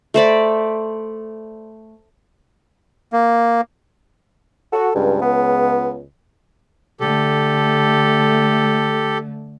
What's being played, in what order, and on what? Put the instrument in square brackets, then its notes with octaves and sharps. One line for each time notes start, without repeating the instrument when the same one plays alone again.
[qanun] A3 C5 D5 B5
[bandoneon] A#3
[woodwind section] F#4 [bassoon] A4
[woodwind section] C#2 [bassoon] G2
[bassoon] B3
[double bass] D3 A3 [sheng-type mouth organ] G4 A4